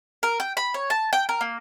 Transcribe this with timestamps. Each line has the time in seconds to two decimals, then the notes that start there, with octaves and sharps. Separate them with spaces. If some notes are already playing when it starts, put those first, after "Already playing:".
0.23 A#4
0.40 G5
0.57 B5
0.74 C#5
0.90 A5
1.13 G5
1.29 A#4
1.41 A#3